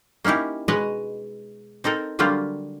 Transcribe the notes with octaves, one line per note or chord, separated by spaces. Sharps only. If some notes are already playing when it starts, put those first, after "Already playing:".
A#3 C#4 D#4 E4 G4
B2 G#3 B4 C#5 D#5
C4 D#4 A4 A#4
D3 F#3 G3 A#3 F4 G4